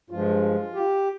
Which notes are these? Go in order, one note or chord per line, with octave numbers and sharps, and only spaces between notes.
G2 F3 G#3 F4
G4